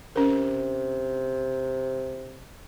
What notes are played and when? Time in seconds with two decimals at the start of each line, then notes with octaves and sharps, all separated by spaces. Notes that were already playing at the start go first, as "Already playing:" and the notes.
0.16 C3 C#4 A#4